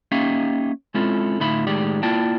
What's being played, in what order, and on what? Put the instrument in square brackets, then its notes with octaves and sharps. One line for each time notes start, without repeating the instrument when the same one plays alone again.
[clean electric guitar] A#3 C#4 D#4 G4 E5 F5
G#3 C4 C#4 E4 F4 A4
D2 A2 D#4 F4 E5 B5
A2 D#3 G#3 G4 D5
A#3 E4 F4 D5 G5 A5